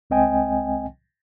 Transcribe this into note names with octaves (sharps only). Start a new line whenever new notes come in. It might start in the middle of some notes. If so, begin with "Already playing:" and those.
C2 G#3 C4 D#5 G5 G#5